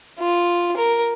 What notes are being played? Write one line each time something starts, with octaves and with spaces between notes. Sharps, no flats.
F4
A#4